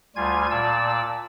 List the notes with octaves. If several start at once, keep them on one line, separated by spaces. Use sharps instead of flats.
D2 G3 F4 G#5 G#6
A#2 D5 A5 E6